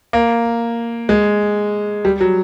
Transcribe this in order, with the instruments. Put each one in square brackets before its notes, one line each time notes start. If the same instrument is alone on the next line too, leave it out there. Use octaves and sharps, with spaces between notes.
[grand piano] A#3
G#3
G3
F#3